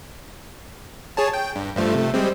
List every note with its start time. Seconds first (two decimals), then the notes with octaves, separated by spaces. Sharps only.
1.17 G#4 C#5 A5
1.33 G5
1.56 G2
1.76 G2 F3 A3
1.94 C3 A3
2.14 G3 G#3 C4